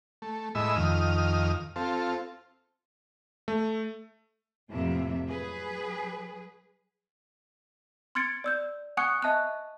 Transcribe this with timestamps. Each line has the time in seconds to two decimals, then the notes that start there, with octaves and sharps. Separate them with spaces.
0.22 A3
0.55 A2 G#3 E4 D#5 B5 E6
0.76 F2 D#3 D#6 F6
1.76 C4 F4 A4
3.48 A3
4.69 F2 A2 C3 E3 A#3 E5
5.27 F#3 G#4 B4
8.15 C6 F6 G#6 A6 C#7 D7
8.44 D5 E6 G6
8.97 F#5 G#5 C#6 D#6 F#6 C#7
9.22 D#5 E5 A5 C#6 F#6